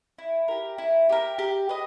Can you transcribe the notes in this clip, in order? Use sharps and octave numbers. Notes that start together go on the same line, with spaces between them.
E4
G4 A#4
E4
G4 A#4
G4
B4 D#5